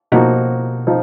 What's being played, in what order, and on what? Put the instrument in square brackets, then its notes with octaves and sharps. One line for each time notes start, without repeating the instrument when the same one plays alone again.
[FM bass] B2 [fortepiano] F3 A#3 D#4 F#4
[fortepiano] F3 D#4